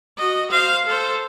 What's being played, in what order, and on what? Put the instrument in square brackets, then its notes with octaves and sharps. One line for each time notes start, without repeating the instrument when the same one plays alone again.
[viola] F#4 D#5
C5 F5
A4 C5